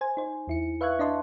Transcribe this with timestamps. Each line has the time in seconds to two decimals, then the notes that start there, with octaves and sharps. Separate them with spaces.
0.01 C5 G#5
0.17 D#4 C5
0.48 E2 E4 C#7
0.81 B4 E5 F5 C#6 F#6 G#6
0.99 D4 D5 D#5 A5 C6